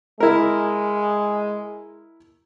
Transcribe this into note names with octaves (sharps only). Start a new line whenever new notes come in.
G#3 E4 A#4